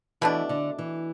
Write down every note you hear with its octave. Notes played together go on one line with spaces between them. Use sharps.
B2 E3 A3 D4
D3
E3